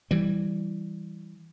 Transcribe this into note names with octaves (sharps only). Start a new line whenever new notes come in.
E3 G3